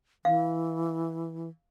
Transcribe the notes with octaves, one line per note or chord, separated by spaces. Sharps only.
E3 F5